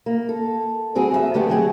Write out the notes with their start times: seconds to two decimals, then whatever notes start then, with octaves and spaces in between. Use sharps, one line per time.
0.06 A#3
0.29 A4
0.95 G3 C4 F#4 G#4
1.11 F2 F4 E5
1.34 D3 A3 B3 D4 G4 G#4
1.49 F2 F#3 F#4 G#4 G5